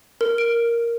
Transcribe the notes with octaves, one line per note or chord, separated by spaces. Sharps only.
A#4
D7